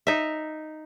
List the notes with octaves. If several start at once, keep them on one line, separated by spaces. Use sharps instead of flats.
D#4 E5